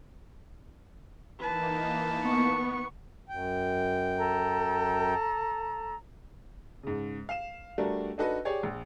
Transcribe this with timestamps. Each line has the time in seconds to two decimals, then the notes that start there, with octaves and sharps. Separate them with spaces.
1.39 E3 A#3 D#4 B4 A5
2.24 B3 C#6
3.29 F#2 G5
4.18 A4 A#5
6.83 G#2 C#3
7.29 F5 E7
7.78 G3 A3 D4 F#4 A#4
8.18 D4 D#4 F#4 A4 B4 D#5
8.45 G4 G#4 C#5 D5
8.63 A#1